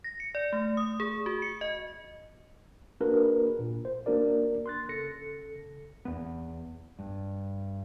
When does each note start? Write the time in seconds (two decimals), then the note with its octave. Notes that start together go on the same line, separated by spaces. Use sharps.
0.04 A#6
0.20 C#7
0.35 D5
0.53 A3
0.77 D#6
1.00 G#4
1.26 F#4
1.42 C#7
1.61 D#5
3.00 A#3 D4 F#4 G#4 A#4 B4
3.59 A#2
3.85 C5
4.06 A#3 D4 F#4 A#4 D5
4.66 C6 F#6 A6
4.89 C#3 A4 A#6 C#7
6.05 E2 B3
6.99 G2